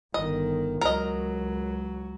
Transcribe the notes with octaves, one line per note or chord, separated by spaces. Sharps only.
G1 D#3 D#5
C#2 F#3 A#4 D#5